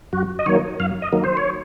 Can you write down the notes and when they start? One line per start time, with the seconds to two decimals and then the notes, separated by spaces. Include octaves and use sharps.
0.13 F#2 F#4
0.39 D#5
0.46 D#3 F#3 A#3 C#5
0.80 F#2 F5
1.02 D#5
1.12 D#3 F#3 A#3
1.24 C5
1.37 C#5